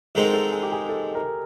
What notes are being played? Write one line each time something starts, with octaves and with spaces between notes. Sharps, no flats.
G#2 D#3 G#3 C4 D#4 A4
A#4
A4
G#4
G4
G#4
A4
A#4